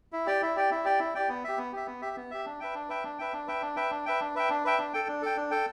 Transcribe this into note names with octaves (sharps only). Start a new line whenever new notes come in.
E4
G4 D5 G5
E4
G4 D5 G5
E4
G4 D5 G5
E4
G4 D5 G5
B3
G4 E5
B3
G4 E5
B3
G4 E5
B3
G4 E5
D4
B4 E5 G5
D4
B4 E5 G5
D4
B4 E5 G5
D4
B4 E5 G5
D4
B4 E5 G5
D4
B4 E5 G5
D4
B4 E5 G5
D4
B4 E5 G5
D4
A4 G5
D4
A4 G5
D4
A4 G5